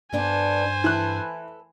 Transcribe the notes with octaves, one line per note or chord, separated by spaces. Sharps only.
G2 B3 D4 A4 C5 G#5
E3 A4 B4 F#6